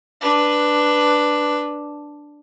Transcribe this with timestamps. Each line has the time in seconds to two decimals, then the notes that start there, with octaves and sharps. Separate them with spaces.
0.21 D4 B4